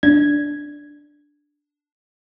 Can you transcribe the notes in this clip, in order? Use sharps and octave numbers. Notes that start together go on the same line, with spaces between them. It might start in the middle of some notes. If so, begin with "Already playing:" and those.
D4 G#6